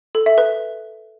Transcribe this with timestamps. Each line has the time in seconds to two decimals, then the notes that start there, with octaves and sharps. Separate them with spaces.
0.15 A4
0.26 E5
0.38 B4